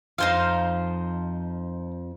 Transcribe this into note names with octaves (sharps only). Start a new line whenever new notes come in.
F2 F3 D#4 C5 F5